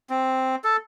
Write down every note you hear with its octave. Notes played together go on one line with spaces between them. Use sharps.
C4
A4